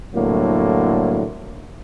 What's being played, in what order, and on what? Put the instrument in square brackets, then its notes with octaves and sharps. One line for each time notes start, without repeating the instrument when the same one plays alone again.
[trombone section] C2 A2 D3 F#3 A#3